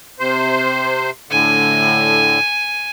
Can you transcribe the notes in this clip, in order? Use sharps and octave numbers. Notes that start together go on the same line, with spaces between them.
C3 C5
A2 D3 G#5